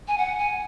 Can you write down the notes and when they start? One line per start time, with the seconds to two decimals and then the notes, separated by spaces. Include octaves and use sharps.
0.08 G#5
0.18 F#5
0.39 G#5